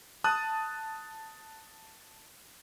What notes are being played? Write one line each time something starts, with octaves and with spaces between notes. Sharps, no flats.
A5 D#6 F#6